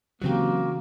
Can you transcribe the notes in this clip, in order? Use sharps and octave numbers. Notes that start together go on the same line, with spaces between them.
C#3 E3 F#3 A#3 C4 F#4 G4